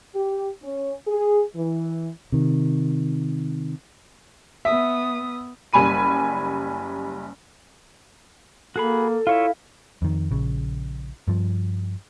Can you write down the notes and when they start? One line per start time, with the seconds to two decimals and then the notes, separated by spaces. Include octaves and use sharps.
0.16 G4
0.63 C#4
1.07 G#4
1.56 E3
2.32 C3 D#3
4.65 B3 E5 D#6
5.73 F#1 G3 G#5 B5 D#7
8.76 A#3 F#4 G#4 A4 B5
9.27 E4 F4 C#5 E5 F5
10.02 F2 D#3
10.31 A#1 C#3
11.28 G2 F3